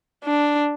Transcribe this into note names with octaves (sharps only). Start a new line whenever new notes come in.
D4